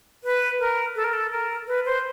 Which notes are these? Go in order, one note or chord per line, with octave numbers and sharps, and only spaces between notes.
B4
A#4
A4
A#4
A4
A#4
B4
C5